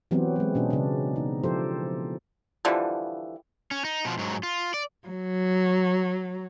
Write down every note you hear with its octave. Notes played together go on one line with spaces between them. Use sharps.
E3 F#3 B3 C4 G4
F#3 G#3
B2 C#4 D4
C#3 D4
D#4
F3 E4 G4 A4 C5
D3 E3 F3 G3
C#4
D#4
B2 F3
G#2 F#3
F4
D5
F#3